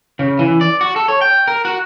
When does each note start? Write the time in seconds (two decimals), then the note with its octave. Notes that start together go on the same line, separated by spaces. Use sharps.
0.19 C#3
0.39 E3
0.61 D5
0.81 F#4
0.96 A4
1.08 C#5
1.21 G5
1.48 A#4
1.65 F#4